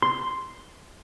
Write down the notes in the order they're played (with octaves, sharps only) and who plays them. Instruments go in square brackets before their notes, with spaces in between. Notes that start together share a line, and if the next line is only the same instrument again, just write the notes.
[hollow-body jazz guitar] C6